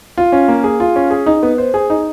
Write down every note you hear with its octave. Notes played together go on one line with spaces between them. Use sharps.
F4
C#4
A#3
G#4
F4
C#4
G#4
D#4
B3
C5
G#4
D#4